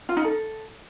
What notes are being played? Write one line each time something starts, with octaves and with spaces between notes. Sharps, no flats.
F4
D#4
A4